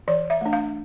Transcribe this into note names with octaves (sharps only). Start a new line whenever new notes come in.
E3 D5
E5
A3 D4
F5